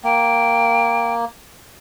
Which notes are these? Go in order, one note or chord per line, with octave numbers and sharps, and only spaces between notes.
A#3 G5